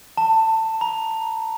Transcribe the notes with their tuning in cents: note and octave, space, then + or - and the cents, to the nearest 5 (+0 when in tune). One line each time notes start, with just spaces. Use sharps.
A5 +20
A#5 +30